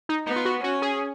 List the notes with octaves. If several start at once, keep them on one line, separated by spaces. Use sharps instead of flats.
D#4
B3 D#4
F4
F#4
C#4 F#4
G#4